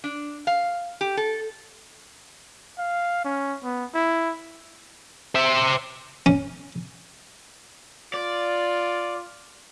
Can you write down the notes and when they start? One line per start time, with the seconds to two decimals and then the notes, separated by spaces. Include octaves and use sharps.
0.04 D4
0.47 F5
1.01 G4
1.17 A4
2.78 F5
3.24 C#4
3.64 B3
3.94 E4
5.35 C5 E5
6.26 C#4
8.14 F4 D5